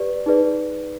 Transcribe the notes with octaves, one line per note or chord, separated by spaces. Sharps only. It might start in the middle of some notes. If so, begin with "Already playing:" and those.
Already playing: G4 B4 D5
D#4 G#4 B4 D5